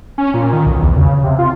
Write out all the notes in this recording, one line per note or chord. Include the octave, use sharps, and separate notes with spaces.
C#4
A#2
D#3
B1
E2
C#3
C3
F4